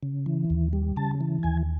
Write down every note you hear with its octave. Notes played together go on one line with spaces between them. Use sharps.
C#3
E3
D#2
G3
C#3 A5
E3
D#2 G#5